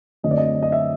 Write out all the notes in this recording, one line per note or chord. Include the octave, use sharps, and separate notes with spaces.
F#2 D3 F#3 A3 C4 D#5
D5
D#5
D#5
E5